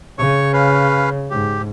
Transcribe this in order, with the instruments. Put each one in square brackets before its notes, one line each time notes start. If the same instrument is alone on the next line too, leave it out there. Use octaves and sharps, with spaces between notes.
[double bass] C#3 [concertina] C#5 C#6
[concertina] C#4 B4 F5
[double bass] G#2 [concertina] G4